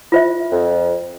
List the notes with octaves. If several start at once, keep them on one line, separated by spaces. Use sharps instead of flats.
F4 C5 E5
F2